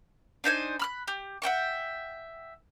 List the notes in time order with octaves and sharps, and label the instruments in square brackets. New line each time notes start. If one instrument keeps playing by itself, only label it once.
[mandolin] D4 D#4 C5 G#5
B5 F6 F#6
G4
E5 F#5 G5 C#6